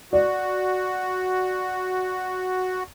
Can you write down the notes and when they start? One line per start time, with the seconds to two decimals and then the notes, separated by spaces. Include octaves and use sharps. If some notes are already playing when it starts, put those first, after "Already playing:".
0.13 F#4 D5